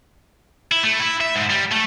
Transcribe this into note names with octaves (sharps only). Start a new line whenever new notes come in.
E4
A3
E4
E5
G#2
G3
A3